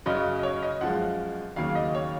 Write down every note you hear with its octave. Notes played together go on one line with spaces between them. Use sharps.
F#2 C#3 F#3 D#5
D#5
C#5
D#5
F#2 F3 G#3 F#5
D#2 C#3 F#3 A#3 F5
D#5
C#5